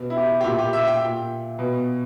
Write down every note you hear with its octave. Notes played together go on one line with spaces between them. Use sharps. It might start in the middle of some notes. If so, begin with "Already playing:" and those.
Already playing: B2
E4
G4
G4
A#2 E4
G4
E5
G5
A#2
B2